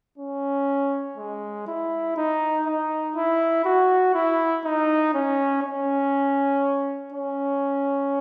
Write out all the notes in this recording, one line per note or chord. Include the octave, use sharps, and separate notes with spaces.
C#4
G#3
E4
D#4
D#4
E4
F#4
E4
D#4
C#4
C#4
C#4